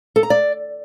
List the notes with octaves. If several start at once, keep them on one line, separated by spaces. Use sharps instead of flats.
A4
A#5
D5